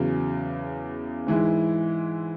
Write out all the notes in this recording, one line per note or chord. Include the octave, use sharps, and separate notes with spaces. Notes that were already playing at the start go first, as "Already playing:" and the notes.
Already playing: E2 C#3 F#3
G#2 E3 G#3 E4